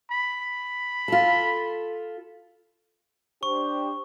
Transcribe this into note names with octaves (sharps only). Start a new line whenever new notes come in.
B5
F4 A4
D4 G4 C5 C#6